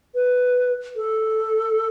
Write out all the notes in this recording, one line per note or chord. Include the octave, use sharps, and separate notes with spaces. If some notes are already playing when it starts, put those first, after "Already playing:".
B4
A4